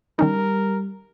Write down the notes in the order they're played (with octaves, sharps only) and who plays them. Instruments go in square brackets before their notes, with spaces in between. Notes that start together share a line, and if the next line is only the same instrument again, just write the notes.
[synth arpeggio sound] D#3 C#4 D#4 [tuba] G3 [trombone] A#4